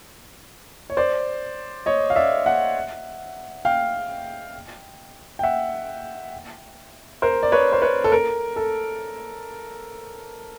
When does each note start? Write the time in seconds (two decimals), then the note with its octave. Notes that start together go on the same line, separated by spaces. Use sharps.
0.90 C#5
0.97 C5 D5
1.86 C#5 D#5
2.10 F5
2.16 D5 E5
2.46 E5 F#5
3.65 F5 G5
5.39 G5
5.43 E5 F#5
7.22 A#4 C5
7.43 D5
7.52 B4 C#5
7.73 C5
7.82 B4 C#5
8.04 A4
8.12 A#4
8.56 A4